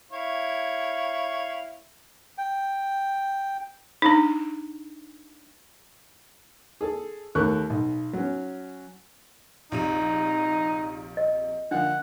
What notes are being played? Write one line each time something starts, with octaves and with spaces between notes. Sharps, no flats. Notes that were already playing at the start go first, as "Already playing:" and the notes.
E4 C#5 F5
G5
D4 D#4
G#4 A4
D#2 A3 A#4 C#6 F#6
B1
F#3 C#4
A#1 C3 D#4 D#7
D#5
D3 F3 A#3 D4 F#5